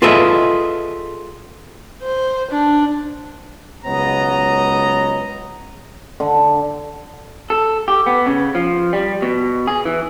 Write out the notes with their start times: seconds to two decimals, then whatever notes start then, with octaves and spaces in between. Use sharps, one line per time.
0.02 F4 G#4 A4 B4 D#5 E5
2.03 C5
2.51 D4
3.85 C#2 F#3 B3 C#5 D#5 A#5
6.20 D3
7.50 A4
7.88 G4
8.06 B3
8.26 C#3
8.55 F3
8.93 G3
9.22 B2
9.68 G#4
9.85 E3